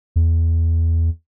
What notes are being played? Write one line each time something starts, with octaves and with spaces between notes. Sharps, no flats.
E2